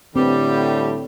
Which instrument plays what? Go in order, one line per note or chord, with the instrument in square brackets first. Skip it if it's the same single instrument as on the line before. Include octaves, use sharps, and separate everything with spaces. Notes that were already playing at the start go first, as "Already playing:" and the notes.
[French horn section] A2 D3 [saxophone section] G3 G4 [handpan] C4 B4